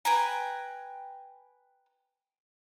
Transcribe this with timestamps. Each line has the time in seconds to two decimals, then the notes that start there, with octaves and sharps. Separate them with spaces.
0.05 B4 G5 G#5 A#5